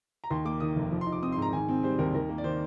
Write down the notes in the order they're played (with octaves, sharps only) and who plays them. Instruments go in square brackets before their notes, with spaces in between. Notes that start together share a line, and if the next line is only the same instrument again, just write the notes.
[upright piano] A#5
D#2 C6
A#3 D6
D#3 D#6
F1
F3
C6
D#4
D6
C4 D#6
C6
G#2 A#5
D#3 G#5
C4
G3 C5
D#2 A#4
D#2 A#4
A#3
D5
D#3 C5